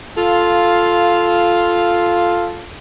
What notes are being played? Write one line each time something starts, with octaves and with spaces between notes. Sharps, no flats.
F4 A4 F5